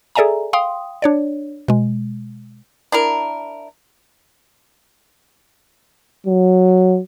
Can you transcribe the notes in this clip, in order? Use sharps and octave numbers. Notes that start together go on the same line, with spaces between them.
G#4 A4 D5 E5 G#5 A#5
F5 G5 C6 D#6
D4 C#5 D5
B2 G#3
D4 E4 A#4
F#3